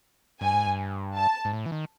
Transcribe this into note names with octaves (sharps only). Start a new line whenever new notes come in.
G2 G#5
G#2
G2
A5
G#2
A2
E3
D#3